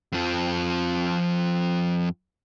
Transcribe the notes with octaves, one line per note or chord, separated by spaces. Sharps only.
F2 F3